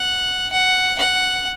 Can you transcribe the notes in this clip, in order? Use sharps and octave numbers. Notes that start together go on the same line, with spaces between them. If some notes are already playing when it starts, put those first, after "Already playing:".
Already playing: F#5
F#5
F#5